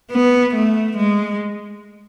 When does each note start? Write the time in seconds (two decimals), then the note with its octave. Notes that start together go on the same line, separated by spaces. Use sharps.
0.12 B3
0.55 A3
0.97 G#3